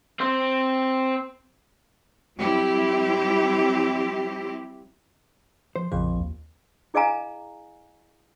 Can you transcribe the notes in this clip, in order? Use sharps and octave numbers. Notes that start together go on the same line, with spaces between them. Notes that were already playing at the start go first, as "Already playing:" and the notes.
C4 C5
F#3 G3 C4 E4 G4
F3 C5
A#1 F2 C#3 G#4
D#2
E4 G#4 D#5 F5 G#5 A#5